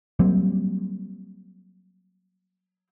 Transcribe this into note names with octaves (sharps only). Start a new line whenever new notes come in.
F#3 G3 A#3 C4